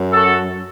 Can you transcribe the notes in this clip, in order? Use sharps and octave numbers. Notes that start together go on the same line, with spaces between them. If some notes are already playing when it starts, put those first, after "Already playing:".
Already playing: F#2
F#4 A4